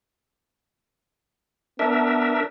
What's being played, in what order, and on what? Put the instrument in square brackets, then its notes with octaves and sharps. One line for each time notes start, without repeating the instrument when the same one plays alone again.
[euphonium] B3 [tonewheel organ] D4 A#4 E5